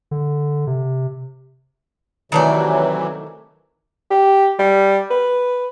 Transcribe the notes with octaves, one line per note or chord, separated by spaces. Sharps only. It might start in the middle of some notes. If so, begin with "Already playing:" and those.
D3
C3
C3 D#3 E3 F#3 A3 D5
G4
G3
B4